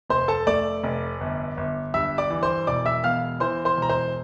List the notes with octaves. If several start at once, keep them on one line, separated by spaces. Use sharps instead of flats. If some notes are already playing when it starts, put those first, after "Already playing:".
F1 C5 C6
A4 A5
A3 D5 D6
F1
G1
G1
G2 E5 E6
D5 D6
E3
C5 C6
E1 D5 D6
E5 E6
E2 F5 F6
E3 C5 C6
C5 C6
E1
A#5
C5 C6